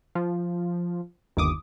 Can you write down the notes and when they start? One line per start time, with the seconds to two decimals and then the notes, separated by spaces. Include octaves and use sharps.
0.15 F3
1.37 G1 D#2 D6 D#6